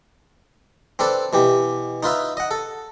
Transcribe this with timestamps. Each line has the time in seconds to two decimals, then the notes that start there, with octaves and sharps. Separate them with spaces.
0.99 C4 D4 A4 B4
1.33 B2 E3 G4
2.03 D#4 F4 B4 E5
2.37 D#5 F#5
2.51 A4